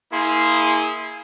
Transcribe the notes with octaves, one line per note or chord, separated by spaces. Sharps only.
A#3 E4 G#4 C6